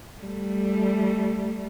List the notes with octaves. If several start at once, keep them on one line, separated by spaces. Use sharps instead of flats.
G3 A3